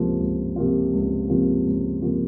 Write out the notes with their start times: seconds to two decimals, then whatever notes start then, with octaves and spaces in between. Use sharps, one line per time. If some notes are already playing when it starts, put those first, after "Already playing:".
Already playing: C#2 C3 F3 A#3 F4
0.20 C#2
0.56 C3 F3 A#3 F4
0.93 C#2
1.29 C3 F3 A#3 F4
1.66 C#2
2.02 C3 F3 A#3 F4